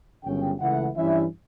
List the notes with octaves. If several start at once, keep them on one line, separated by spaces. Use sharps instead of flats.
G1 F#2 C#3 G5
C#2 C#3 E3 A3 E4 F#5
G2 E3 G3 C#4 E4 E5